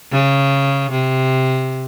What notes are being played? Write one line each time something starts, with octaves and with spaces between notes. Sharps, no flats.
C#3
C3